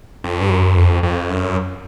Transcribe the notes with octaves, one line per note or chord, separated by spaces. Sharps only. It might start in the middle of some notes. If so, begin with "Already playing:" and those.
F2
G2
F#2
F2
F2
F#2